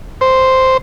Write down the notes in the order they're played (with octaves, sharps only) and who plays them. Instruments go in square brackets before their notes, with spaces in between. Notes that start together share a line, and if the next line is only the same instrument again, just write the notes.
[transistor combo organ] C5